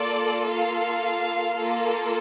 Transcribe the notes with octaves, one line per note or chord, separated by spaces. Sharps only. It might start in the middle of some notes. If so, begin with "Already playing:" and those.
Already playing: A#3 F4 A4 D5
F5
A#3 F4 A4